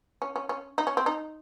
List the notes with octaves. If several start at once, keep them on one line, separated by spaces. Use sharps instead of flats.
C#4
C#4
C#4
D#4
C#4
C4
D#4